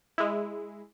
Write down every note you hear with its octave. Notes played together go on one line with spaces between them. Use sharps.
G#3 E4